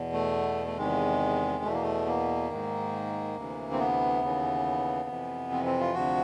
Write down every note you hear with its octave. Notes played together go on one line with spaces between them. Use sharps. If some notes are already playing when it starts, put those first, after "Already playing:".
Already playing: E2 B2
A3
A3
E2 C3 D#3 G#3
E2 B2 A3
A#3
A3
A#3
G#2 D#3
D2 C3 E3
C4
B3
D#2 C#3 E3
F2 C3 E3
C4
C4
F4
D2 C3 F3 F#4